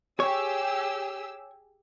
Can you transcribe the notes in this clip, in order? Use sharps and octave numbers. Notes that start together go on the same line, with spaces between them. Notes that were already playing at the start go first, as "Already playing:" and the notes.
G4 G#4 C#5 E6